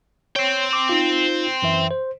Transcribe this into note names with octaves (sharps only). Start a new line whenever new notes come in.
C5 C#5 G5
D6
D#4 F4
F#2 E3 E5
C5